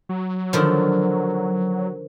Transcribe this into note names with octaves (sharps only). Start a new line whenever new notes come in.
F#3
D3 D#3 F3